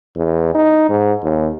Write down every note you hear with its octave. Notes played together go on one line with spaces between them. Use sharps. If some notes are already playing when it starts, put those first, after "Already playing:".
E2
D#4
G#2
D#2